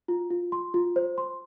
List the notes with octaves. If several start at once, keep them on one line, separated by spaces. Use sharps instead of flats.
F4
F4
C6
F4
C5
C6